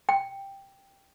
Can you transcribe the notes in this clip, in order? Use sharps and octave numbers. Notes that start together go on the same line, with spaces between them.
G5